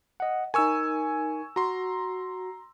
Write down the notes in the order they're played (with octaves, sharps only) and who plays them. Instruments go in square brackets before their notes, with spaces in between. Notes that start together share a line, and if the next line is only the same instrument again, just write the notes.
[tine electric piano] D#5 F#5
[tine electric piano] D#4 A#4 [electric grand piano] G#5 C#6 E6
[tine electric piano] F#4 [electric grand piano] A#5 C6